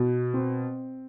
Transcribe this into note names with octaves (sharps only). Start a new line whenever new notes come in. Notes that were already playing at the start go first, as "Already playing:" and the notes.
Already playing: B2
C4